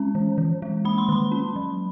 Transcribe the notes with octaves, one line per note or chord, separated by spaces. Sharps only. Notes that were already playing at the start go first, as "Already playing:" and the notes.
Already playing: G#3 C#4 A#5
E3
E3
G#3
A#3 B5
C6
D#3 B5
C#4
F#3